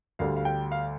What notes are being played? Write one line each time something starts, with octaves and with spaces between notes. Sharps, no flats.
D2 D3 G3 F5
F5
G5
F5